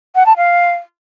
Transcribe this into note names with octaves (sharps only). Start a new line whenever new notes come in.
F#5
A5
F5